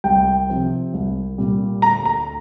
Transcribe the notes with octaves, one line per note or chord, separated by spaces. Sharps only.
C2 G5
C3 F3 C4
C2
A#2 G3 A#3
D2 A#5
A#5